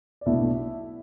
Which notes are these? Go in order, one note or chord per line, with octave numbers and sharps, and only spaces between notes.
D5
B1 B2 A3 D4 E4 E5